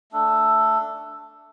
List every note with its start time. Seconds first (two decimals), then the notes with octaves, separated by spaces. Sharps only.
0.12 A3 D4 A4